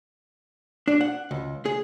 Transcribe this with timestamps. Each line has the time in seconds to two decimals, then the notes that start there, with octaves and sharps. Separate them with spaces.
0.88 D4
1.01 F#5
1.31 C#2
1.66 G#4